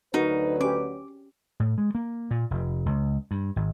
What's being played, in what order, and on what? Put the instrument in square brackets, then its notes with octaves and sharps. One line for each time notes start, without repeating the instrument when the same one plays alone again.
[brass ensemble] D2 F#3 B4 [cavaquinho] D#4 [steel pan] F#4 A#4
[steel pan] C#4 G4 [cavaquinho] D6
[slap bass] A2
G#3
A#3
A#2
F1
C#2
G2
G#1